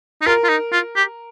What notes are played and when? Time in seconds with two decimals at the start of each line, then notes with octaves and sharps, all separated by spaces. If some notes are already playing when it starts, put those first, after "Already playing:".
0.21 D#4
0.26 F4 A#4
0.44 F4
0.49 D#4
0.72 F4
0.96 G4